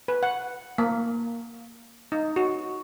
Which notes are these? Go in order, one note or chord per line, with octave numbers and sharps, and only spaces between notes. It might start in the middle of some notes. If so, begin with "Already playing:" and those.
B4
F#5
A#3
D#4
F#4